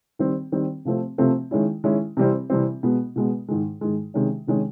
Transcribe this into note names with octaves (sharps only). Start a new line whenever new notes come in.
D#3 G3 C4
D#3 G3 C4
C3 F3 A3 C4
C3 F3 A3 C4
D#3 G#3 C#4 E4
D#3 G#3 C#4 E4
C3 E3 G3 C4
C3 E3 G3 C4
B2 G#3 B3
B2 G#3 B3
G#2 D#3 G#3
G#2 D#3 G#3
C3 D#3 G#3 C#4
C3 D#3 G#3 C#4